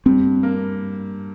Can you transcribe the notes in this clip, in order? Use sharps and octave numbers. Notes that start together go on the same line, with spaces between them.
G2 C4
A#3